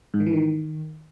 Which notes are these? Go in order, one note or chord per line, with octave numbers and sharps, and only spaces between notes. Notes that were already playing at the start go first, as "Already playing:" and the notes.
G#2
D#3
E3
D#3